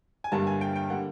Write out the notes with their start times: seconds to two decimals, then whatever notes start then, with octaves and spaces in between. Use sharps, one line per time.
0.24 G#5
0.32 G1 G2 D3 G3 A#3 A5
0.47 G#5
0.61 G5
0.76 G5
0.90 D3 G3 A#3 F#5